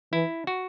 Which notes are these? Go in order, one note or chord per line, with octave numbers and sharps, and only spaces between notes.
E3 E4
F#4